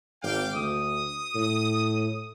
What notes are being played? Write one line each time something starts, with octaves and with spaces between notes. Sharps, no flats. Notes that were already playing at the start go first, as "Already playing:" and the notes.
G#1 F5 G5 D6
D2 D#6
A2